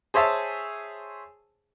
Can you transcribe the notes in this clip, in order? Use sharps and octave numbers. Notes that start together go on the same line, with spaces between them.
G#4 C5 C#5 E5 A5